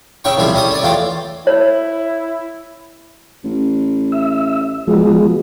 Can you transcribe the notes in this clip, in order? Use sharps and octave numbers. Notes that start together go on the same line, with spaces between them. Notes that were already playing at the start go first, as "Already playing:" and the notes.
C#3 C#4 E5 G5 C#6
C2 C3 F3 G3 G#4 E5
G3 C#4 A4 D#6
C#5 D5
E2 A3 F4 G5 D6
E4 C#5
A1
E5
B2 F3 G#3